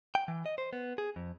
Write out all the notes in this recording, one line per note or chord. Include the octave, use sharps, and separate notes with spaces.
G5
E3
D#5
C5
B3
G#4
F2